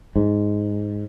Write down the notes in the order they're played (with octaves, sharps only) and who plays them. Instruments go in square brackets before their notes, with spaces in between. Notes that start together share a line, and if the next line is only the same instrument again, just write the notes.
[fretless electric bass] G#2